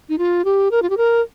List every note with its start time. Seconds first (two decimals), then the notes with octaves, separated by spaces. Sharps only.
0.09 D#4
0.18 F4
0.45 G4
0.71 A#4
0.82 F4
0.90 G4
0.97 A#4